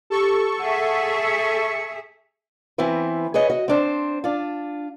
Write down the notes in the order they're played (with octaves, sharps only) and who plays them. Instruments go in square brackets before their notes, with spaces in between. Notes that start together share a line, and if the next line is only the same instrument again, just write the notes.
[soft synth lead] G4 [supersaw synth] A4 C#6
[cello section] G#4 E5 [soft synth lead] F#5
[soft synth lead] C#7
[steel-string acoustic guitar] E3 B3 C4 E4 B4
G#4 B4 C#5 D#5
F#4 D#5
C4 D4 C5
D4 F4